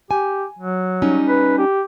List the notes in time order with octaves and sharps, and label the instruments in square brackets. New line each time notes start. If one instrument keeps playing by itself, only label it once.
[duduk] G4 [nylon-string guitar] G#5
[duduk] F#3
[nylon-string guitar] G3 C#4 D#4
[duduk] B4
G4